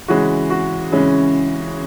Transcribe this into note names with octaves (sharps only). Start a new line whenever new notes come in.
C#3 E3 G#3 C#4 F#4
F#4
C#3 E3 G#3 C#4